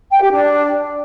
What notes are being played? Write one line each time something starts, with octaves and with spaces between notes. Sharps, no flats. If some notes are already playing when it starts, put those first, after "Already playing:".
G5
G4
D4